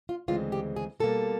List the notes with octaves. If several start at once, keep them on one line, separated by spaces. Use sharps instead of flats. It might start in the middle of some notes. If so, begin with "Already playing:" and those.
F4
D2 C#3 E3 G#3 C4 F4
G4
G#4
B2 G3 A#3 A4